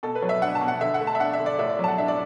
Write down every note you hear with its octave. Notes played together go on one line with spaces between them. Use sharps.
B2 A4
B4
F#3
E5
D4 F#5
A5
B2
F#5
D3 E5
F#5
A3
A5
E5
D4 F#5
E5
D3
D5
A2 E5
D5
F#3 A5
F#5
D4 E5
D5